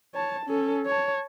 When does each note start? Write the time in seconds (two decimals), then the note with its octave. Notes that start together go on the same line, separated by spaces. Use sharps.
0.15 C#5 A5
0.46 C#4 A4
0.86 C#5 A5